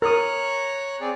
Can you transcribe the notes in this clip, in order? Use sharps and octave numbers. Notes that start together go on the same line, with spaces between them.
A#4 C#5 A#5 D#6 F#6
C4 G#4 D5